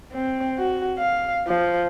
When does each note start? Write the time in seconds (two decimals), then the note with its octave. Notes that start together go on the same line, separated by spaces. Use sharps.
0.12 C4
0.58 F#4
0.99 F5
1.47 F3